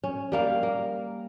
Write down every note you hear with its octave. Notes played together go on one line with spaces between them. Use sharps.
C#4
G3 A#3 F5
A#3